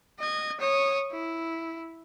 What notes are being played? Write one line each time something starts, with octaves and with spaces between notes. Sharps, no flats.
D#5 G#6
C#5 D#6
E4